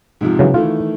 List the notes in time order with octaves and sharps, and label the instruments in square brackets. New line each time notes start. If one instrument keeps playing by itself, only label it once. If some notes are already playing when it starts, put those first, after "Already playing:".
[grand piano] G#2 C3 F3
[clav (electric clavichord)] C#3 E3 F#3
[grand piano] D#3 E3 A3 [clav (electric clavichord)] F4